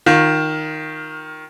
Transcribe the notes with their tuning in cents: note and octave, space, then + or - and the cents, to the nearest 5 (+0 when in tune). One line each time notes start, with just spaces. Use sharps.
D#3 +0 F4 +20